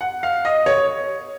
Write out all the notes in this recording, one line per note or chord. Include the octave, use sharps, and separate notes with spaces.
F#5
F5
D#5
C#5